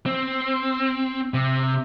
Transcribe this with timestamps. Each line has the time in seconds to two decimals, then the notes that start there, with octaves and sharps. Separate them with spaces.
0.06 C4
1.34 C3